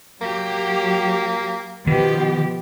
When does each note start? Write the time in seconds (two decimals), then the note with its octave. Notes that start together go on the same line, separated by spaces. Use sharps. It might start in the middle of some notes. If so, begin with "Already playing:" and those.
0.21 F#3 A#3 G4
1.87 B2 D#3 F3 G4